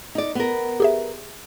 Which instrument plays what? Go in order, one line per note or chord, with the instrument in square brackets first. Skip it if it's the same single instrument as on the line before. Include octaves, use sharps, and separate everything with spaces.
[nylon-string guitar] D#4 D5
B3 A#4
[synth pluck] G4 G#4 E5